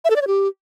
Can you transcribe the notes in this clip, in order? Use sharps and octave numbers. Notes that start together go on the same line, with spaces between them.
E5
A4
D5
C#5
G4